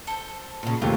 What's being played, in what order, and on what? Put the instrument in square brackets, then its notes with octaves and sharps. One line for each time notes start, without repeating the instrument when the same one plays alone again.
[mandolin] A4 C5
[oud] A#2 C#3
[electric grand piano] D#2 C3 A3 [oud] F4